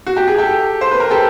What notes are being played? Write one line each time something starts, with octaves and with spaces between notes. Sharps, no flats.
F#4
G4
G#4
G4 A4
C5
B4
A#4
G4 A4